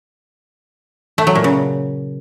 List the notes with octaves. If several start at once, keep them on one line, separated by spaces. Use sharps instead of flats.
A3
F#3
A#2
C#3